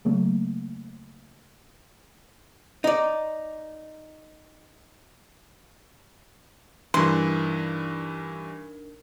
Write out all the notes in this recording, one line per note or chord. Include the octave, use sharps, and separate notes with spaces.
C#3 F#3 A3 A#3
D#4 D5
G2 E3 D4 D#4 A#4 C6